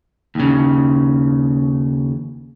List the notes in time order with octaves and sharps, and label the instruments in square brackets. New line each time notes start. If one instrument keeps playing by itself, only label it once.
[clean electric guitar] D#2 C#3